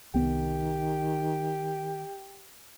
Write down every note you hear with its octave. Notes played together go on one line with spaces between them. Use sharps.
C2 D#3 B3 G4